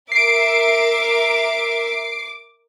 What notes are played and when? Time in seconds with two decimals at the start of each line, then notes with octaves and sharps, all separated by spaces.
0.12 A#4 E5 D6 C7 D7